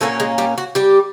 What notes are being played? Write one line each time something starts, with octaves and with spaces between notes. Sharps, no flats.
A#2 F#3 A3 A#3 C#4 A4
G#3 G#4
G3 G4
F#4
G3 G4